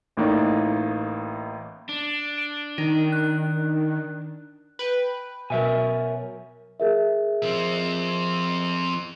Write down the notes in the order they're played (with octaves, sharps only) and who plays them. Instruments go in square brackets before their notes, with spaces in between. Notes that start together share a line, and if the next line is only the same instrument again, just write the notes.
[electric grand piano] A1 A2 A#3 D#4 D5
[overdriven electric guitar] D4
[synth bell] D7
[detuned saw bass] D#3 [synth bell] D#4
[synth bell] F#6
[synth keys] B4 G5
[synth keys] B2 F#3 [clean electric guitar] A#4 E5 G#5
[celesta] G#4 A#4 E5
[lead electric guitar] F3 C4